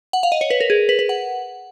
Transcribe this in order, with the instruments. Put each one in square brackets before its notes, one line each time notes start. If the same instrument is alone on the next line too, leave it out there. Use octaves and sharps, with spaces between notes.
[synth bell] F#5
F5
D#5
C#5
B4
A#4
G#4
B4
B4
F#5